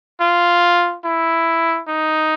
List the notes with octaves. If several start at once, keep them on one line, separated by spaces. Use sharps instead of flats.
F4
E4
D#4